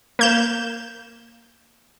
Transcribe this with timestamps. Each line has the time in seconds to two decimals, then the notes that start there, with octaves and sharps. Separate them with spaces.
0.19 A#3 G6 E7